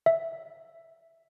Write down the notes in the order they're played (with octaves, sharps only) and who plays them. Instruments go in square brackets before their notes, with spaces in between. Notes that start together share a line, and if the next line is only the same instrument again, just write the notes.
[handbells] E5